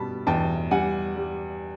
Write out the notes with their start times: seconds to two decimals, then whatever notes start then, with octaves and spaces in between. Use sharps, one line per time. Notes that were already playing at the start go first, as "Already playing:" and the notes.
Already playing: B2 G3 A5 B5
0.27 E2 G5 A5
0.71 G3 F#5 G#5
1.16 G3